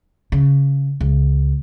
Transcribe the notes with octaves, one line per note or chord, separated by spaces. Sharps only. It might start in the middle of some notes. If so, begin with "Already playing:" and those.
C#3
C#2